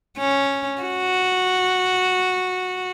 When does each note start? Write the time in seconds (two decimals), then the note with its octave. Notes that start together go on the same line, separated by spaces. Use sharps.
0.17 C#4
0.82 F#4